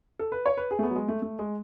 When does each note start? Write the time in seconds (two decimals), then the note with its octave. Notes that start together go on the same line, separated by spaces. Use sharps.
0.19 A4
0.32 B4
0.46 C#5
0.57 B4
0.71 G#4
0.79 A3
0.83 B3
0.90 F#3
0.96 G#3
1.08 A3
1.22 A3
1.39 G#3